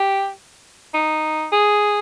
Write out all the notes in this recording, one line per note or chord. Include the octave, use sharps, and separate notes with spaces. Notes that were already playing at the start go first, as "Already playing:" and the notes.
Already playing: G4
D#4
G#4